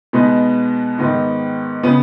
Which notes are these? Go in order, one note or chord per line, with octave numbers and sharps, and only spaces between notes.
B2 G#3 B3 D#4 B4
G#2 D#3 B3 D#4
C#3 B3